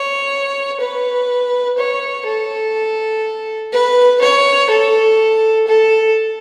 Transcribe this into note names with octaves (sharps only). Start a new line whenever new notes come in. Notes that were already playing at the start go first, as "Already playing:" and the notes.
Already playing: C#5
B4
C#5
A4
B4
C#5
A4
A4